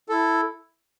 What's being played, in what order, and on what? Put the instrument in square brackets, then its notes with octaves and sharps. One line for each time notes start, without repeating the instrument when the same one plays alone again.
[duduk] E4 [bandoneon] A4